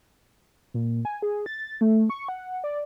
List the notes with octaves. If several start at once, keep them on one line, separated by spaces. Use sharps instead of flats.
A#2
G#5
G#4
A6
A3
C#6
F#5
D5